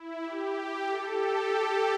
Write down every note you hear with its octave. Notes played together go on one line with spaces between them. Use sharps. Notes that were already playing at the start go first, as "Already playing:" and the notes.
Already playing: E4
G4
A4
G4